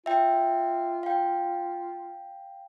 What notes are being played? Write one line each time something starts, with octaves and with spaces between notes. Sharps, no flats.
F4 E5 G5
F5 G5